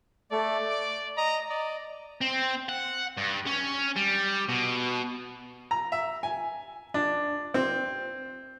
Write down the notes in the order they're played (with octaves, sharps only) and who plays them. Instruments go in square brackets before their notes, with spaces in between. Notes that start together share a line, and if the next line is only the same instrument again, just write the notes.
[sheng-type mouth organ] A3 A4 [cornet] D5
[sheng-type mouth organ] D6
[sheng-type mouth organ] D#5 [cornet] A#5
[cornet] D5 [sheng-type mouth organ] D#5
[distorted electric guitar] C4
F#5
G2
C#4
G3
B2
[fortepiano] A#5
E5
G#5
D4
C4